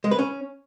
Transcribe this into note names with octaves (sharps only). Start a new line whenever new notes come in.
G#3
B4
C#4